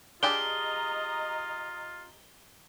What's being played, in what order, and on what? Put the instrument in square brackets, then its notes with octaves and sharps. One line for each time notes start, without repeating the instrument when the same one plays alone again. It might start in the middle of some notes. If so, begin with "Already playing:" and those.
[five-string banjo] D4 G4 G#4 [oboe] F4 [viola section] D#5 A#5 [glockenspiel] G7